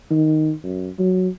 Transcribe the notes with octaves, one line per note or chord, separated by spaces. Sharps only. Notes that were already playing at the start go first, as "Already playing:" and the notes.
D#3
F#2
F#3